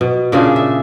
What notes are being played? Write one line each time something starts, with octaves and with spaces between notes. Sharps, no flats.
B2
A#2 C#3 D4 G#4
E5